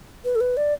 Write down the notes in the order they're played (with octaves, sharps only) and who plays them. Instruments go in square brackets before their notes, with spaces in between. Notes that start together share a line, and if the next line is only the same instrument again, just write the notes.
[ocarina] B4
A4
B4
D5